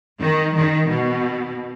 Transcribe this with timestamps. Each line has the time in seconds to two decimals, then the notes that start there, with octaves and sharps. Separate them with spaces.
0.21 D#3
0.55 D#3
0.90 B2